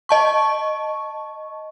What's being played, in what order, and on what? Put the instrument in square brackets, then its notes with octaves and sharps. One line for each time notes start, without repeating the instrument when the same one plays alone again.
[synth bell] D#5 A5 C#6